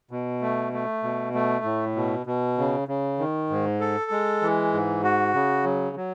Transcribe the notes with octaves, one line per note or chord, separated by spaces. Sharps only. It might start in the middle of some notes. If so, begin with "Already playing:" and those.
B2
A3
A3
B2
A3
A2
B2
B2
C#3
C#3
D#3
G#2
A4
G#3
E3
G#2
F#4
C#3
F#3
F#3